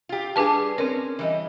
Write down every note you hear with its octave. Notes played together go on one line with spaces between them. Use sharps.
F4 G4
G3 D4 G#4 B4 A5
C4 C#4 A#4
E3 G3 D#5